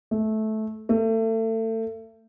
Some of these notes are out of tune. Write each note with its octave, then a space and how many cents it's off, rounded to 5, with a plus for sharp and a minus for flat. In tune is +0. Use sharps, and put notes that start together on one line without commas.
A3 -15
A3 +30